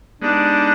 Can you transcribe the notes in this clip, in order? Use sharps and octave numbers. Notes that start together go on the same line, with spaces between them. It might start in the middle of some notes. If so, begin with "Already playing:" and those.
G#3 B3 D4 D#4 G4